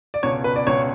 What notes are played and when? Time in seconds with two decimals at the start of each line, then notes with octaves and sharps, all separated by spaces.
0.14 D5
0.23 C#2 B2 C#5
0.44 B4
0.56 D5
0.67 C#2 B2 C#5